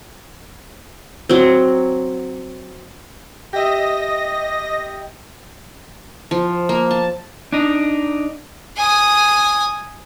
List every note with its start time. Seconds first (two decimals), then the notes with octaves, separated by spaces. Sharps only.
1.29 F#3 C4
3.53 G4 D#5 E5 A#6
6.31 F3
6.69 A#3
6.91 A5
7.52 D4 D#4
8.77 G#5 D#6